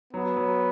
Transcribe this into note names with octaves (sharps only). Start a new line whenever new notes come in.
F#3 B3
F#3